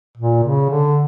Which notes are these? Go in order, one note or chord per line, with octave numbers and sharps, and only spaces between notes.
A#2
C#3
D3